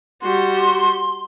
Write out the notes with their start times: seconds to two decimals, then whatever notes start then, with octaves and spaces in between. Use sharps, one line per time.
0.22 G3 F#4 C6